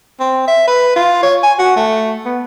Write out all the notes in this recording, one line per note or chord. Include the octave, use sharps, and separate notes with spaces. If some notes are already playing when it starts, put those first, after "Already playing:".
C4
E5
B4
F4
C#5
G#5
F#4
A3
B3